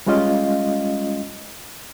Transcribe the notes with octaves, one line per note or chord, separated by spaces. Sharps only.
G3 G#3 C#4 F4 D#5 F5